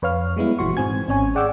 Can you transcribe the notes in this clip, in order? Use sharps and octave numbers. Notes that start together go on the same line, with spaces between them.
F2 B4 C#5 F5 F6
G3 G#3 B3 E4
G1 A#2 E3 F#4 C6 C#6
G#2 C4 G#5 G#6
G#1 C4 C#4 C#5 G#5
G#4 D5 F#5 G5 D6 E6